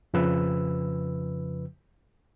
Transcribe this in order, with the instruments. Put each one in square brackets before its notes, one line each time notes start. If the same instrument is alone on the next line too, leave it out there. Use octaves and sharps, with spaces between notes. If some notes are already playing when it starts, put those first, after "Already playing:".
[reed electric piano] F2 C#3 F3 B4 E6